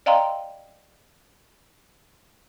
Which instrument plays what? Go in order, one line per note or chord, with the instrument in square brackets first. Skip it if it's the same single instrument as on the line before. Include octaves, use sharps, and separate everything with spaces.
[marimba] D5 D#5 F5 G5 A#5 C6